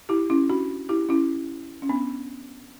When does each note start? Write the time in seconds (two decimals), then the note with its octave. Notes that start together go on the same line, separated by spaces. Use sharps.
0.09 E4 G4
0.30 C#4 E4
0.50 D4 F#4
0.89 E4 G4
1.09 C#4 E4
1.82 C#4
1.89 B3 D4